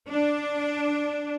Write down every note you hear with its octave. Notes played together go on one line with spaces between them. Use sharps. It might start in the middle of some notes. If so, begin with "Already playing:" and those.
D4